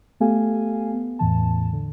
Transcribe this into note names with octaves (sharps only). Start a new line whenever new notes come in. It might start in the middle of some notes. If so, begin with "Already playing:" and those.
A3 B3 G4 A4 F5 G#5
B3
E2 A2 E3 A5
D3